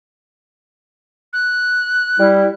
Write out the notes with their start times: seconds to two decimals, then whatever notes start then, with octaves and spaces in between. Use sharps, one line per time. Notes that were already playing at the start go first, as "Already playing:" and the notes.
1.33 F#6
2.19 G3 E4